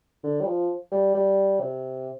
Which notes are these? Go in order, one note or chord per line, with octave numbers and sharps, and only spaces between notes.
D3
G3
F3
G3
G3
C3